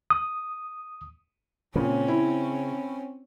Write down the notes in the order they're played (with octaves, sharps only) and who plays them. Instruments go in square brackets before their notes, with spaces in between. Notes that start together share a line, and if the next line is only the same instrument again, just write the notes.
[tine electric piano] D#6
[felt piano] A#2 [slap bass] C#3 [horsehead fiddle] C4 C#4
[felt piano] E4